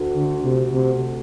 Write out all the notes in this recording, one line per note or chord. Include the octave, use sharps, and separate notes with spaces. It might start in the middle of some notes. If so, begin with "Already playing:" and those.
Already playing: D2
D3
C3
C3